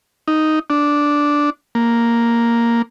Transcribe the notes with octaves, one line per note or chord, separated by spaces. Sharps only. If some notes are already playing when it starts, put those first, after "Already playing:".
D#4
D4
A#3